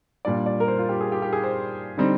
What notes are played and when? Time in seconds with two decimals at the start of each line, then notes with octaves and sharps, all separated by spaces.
0.25 A#2 G3 D4 D5
0.46 D5
0.60 A#4
0.68 C5
0.79 F4
0.89 G4
1.00 G#4
1.12 G4
1.22 G4
1.33 G#4
1.44 C5
1.97 D3 G3 C4 D#4